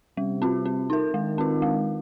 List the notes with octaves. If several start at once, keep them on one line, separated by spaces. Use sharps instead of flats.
C3 G3
C4 F4
C4
D#4 A#4
D#3 G#3
C4 F4
G#3